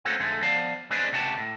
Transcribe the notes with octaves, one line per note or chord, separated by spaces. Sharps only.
A3 A#3 C4 C#4 F#4 A4
F2 D3 G#3 A3
F3 B3 D5 F5 A5
G#3 C4 D4 G#4 B4 D5
C#2 C3 F#4 G4 A5
A2